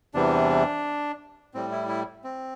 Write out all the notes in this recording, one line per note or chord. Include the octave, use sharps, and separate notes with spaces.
E2 C3 E3 G3 D4
A2 G3 C4
E4
E4
C4